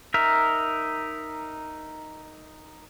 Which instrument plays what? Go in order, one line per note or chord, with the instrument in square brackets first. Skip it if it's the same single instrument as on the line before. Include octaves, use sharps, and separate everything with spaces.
[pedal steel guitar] D#4 A#4 E5